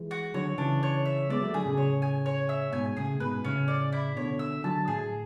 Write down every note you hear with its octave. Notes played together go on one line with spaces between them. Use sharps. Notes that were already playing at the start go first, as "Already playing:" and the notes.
Already playing: E3 G#3
F#4
D3 F#3 C#5
C#3 E3 D4
C#5
E5
G#3 B3 D5
F#3 A3
D3 F#3 G#4
A2 C#3
C#5
G#5
C#5
E5
G#2 B2 G#5
A2 C#3 G#4
G#2 B2 B4
A2 C#3 C#4
D5
E4
B2 D3 C#5
E5
D3 F#3 A5
A2 G#4